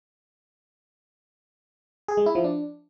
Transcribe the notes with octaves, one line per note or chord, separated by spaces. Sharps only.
G#4
G#3
E4
F3
D4